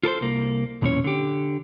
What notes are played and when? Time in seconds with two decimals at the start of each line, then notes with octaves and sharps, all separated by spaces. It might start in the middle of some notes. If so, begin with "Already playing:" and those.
0.03 F4 A4 A#4 C5
0.21 C2 A#3
0.82 B1 E2 A#2 E3 C#4 C#5
1.04 D3 G4